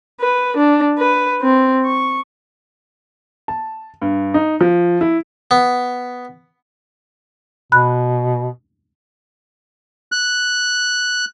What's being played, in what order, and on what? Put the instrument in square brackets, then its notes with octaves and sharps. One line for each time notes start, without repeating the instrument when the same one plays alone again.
[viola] B4
D4
B4
C4
C#6
[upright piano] A5
G2
D#4
F3
E4
[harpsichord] B3
[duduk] B2 [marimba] B5 F#6
[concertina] F#6